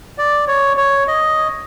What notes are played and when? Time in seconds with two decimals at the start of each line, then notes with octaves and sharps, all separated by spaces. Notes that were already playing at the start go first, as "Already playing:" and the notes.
0.18 D5
0.48 C#5
0.77 C#5
1.08 D#5